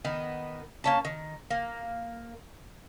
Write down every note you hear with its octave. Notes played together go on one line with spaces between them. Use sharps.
D#3 B3
A#3 C#4 A5
D#3
A#3